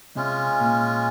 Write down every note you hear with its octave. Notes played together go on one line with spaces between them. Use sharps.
C3 G#3 C#4 F4
A#2